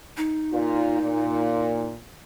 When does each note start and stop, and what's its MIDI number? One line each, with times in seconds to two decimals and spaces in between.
0.17 1.89 63
0.52 0.98 46
0.52 0.98 65
1.01 1.95 46